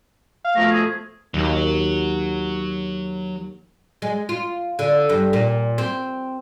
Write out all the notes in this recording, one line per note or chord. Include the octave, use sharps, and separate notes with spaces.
F5
B2 F3 A3 A#5
G#4
D#2 F#3
G#3
F4
D3
G2
A#2
C4